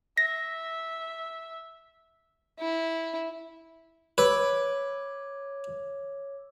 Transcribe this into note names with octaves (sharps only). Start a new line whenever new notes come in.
E5 A#6
E4
B4 C#5 D6 E6